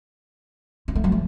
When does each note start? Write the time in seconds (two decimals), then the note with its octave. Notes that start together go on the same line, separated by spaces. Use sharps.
0.88 C4
0.95 A3
1.04 F#3
1.12 A3